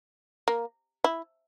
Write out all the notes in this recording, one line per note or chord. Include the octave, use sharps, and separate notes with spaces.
A#3
E4